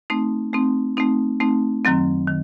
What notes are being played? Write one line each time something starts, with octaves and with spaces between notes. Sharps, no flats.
A3 C4 D#4
A3 C4 D#4
A3 C4 D#4
A3 C4 D#4
F#2 D#3 F#3 C4
D#3